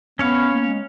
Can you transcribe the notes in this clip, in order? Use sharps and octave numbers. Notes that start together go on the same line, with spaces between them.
B3 C#4 C#5 F5
A#3
G#3